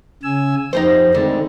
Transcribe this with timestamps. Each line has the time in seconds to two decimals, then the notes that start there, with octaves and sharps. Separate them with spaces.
0.23 C#3 G#5 E6
0.73 F2 D#4 G4 C5
1.14 D2 D3 D#3 G#3 C4